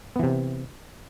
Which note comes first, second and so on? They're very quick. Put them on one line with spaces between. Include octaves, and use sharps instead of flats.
B3 E3 C3